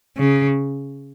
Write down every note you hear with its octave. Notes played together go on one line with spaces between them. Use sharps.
C#3